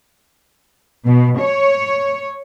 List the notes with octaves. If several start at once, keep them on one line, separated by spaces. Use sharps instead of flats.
B2
C#5